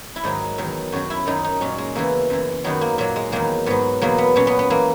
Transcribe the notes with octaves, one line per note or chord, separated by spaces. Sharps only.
E4
G#2 D#3 F#3 D#4
E2 D#3 F#3
F#2 D#3 F#3 F#4
E4
F#2 D#3 F#3 D#4
D#4
A#2 F#3 C#4
G#3
E2 C#3 E3 A#3
F#2 E3
F#2 D#3 F#3 B3
A#3
A#2 F#3 A#3
G#3
E2 D#3 F#3 A#3
G#2 F#3 B3
E2 B2 F#3 A#3
B3
A#2 F#3 C#4
B3
B3
E3 A#3